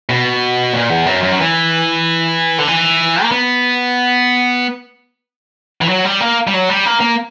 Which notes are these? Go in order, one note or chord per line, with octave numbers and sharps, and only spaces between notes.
B2
A#2
E2
F#2
F#2
F#3
E3
D3
E3
A#3
B3
E3
F#3
G3
A#3
G3
F#3
G3
A#3
A#3